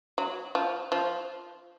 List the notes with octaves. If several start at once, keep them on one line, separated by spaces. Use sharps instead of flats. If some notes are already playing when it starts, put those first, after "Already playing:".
F#3
F3
F3